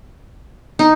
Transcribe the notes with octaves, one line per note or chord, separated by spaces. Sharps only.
D#4